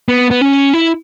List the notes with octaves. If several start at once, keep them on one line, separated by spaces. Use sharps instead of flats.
B3
B3
C#4
E4